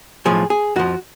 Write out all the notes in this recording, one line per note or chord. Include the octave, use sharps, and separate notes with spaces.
B1 A2 F3 G#4
G#4
F2 F3 F#4